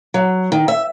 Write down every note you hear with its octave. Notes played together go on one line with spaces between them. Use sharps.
F#3
D#3
E5